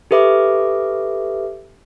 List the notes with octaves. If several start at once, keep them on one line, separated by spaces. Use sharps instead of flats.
G4 A4 B4 E5 D6